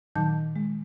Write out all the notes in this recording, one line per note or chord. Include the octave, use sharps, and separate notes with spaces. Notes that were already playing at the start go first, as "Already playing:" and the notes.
A#2 D#3 F#3 D#4 A5 G6
G#3